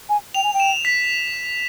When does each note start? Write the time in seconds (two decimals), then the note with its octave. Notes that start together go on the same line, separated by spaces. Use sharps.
0.09 G#5
0.35 G5 F7
0.44 G#5
0.54 G5
0.60 E7
0.85 B6